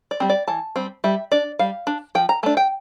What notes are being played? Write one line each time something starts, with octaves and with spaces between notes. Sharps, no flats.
D5
G3 C4
D5
E3 A5
G3 C4
G3 E5
D4 D5
G3 F5
D4
F3 G5
A#5
A3 D4 A5
G5